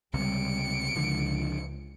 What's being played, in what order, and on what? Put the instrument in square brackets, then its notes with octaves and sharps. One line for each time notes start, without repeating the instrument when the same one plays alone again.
[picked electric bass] C#2 C3 [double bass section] G3 [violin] C#7 D7
[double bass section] C#2 [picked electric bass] D3 F3